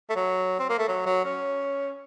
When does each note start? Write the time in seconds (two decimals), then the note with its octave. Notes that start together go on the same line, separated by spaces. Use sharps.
0.10 A3
0.16 F#3
0.59 C4
0.70 A#3
0.79 A3
0.88 F#3
1.06 F#3
1.25 C#4